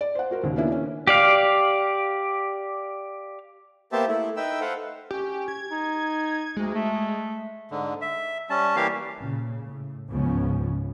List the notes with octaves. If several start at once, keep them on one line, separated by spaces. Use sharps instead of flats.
D5
C5 F#5
F#4 A#4 C5
D#2 C#3
A#3 B3 C#4 D4 E4
C#4
G4 D5 F5
A#3 B3 G4 C5 E5 A5
A3 E4
D#4 B4 E5 G5 E6
A4 B4 C5 F5 F#5
C#4 G4
G#6
D#4
D2 G#3
A3
G#2 D3
E5
G3 C#4 A5
E3 G3 A#3 G4 F5
A#2 C#3
A2
C#2 G#2 C#3 F3 B3 C#4